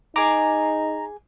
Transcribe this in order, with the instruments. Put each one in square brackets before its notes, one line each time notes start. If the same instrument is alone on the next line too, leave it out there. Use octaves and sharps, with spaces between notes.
[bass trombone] D#4 [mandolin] G#4 D6 [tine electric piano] A#5